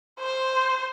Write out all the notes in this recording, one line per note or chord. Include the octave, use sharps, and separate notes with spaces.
C5